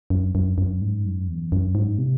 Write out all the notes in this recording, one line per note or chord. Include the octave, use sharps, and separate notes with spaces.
F#2
F#2
F#2
G#2
F#2
E2
F#2
G#2
C3